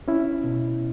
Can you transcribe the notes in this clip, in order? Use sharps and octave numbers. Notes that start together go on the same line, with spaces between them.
C#4 E4
B2